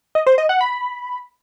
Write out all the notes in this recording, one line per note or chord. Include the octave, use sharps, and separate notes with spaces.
D#5
C5
D#5
F#5
B5